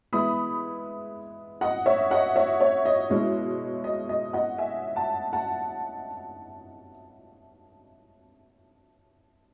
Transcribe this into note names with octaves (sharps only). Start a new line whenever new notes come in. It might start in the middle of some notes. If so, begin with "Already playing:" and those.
E3 G#3 B3 E4 B5 D#6
D#5 F#5
C#5 E5
D#5 F#5
C#5 E5
C#5
D#5
B2 G#3 C#4 E4
D#5
D#5
D#5 F#5
E5 G#5
F#5 A5
F#5 A5